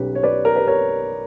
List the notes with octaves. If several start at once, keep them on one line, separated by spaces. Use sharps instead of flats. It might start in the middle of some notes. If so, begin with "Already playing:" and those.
Already playing: B1 B2 G3 C#4 G4 B4
C#5
B4 D5
A#4
B4
A#4 C#5